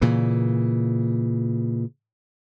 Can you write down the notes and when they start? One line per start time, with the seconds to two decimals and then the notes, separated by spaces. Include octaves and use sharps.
0.01 A#2 C#3 E3